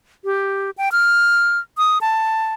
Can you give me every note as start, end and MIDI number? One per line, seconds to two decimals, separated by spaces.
0.25 0.71 67
0.78 0.89 79
0.92 1.59 89
1.78 1.98 87
2.01 2.54 81